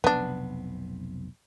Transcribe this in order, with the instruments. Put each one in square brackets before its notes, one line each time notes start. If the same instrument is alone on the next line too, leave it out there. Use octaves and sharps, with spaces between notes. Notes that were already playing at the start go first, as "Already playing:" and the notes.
[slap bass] F1 B1 C3 [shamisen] B3 D4